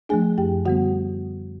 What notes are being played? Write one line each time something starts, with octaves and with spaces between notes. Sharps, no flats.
F3 A3 D4 G#4 G#5
F#2 G4 G5
D3 G3 B3 F#4 F#5